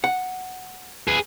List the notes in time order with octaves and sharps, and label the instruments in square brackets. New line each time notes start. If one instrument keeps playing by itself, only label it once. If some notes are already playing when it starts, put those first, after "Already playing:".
[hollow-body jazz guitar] F#5
[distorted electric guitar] G#4 B4